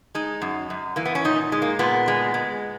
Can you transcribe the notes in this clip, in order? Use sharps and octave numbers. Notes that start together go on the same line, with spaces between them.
G#3 D#4
F#2
F#2
E3 A#3
B3
C#4
A#2 D#4
G#3
A#3
A#2 B3
G#3
G#3